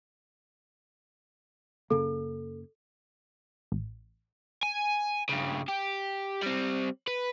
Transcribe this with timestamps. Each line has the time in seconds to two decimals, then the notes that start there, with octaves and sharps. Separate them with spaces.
1.90 F#2 C#3 A#3 A4
3.72 A1
4.63 G#5
5.29 G2 C#3
5.69 G4
6.42 G3 C4
7.07 B4